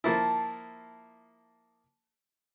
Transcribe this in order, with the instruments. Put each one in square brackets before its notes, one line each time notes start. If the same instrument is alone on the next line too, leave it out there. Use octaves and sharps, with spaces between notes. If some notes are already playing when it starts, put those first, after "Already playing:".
[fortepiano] F3 A#3 E4 [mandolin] A5